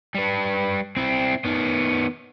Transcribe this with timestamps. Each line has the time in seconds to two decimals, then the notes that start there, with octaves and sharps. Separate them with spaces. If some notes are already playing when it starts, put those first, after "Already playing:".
0.15 G3 B4
0.97 C4 E4
1.45 D#3 B3